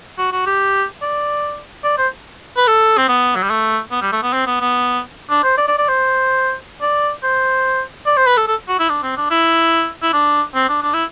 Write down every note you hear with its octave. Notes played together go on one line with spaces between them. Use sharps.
F#4
F#4
G4
D5
D5
C5
B4
A4
C4
B3
F#3
G3
A3
B3
G3
A3
B3
C4
B3
B3
D4
C5
D5
D5
D5
C5
D5
C5
D5
C5
B4
A4
A4
F#4
E4
D4
C4
D4
E4
E4
D4
C4
D4
D4
E4